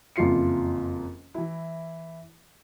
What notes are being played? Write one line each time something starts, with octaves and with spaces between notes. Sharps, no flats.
F#1 F2 E3 F4 C7 C#7
E3 E4